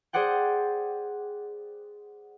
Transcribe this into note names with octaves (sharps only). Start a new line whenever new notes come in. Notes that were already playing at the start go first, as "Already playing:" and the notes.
G#4 C5 D5 F#5 G5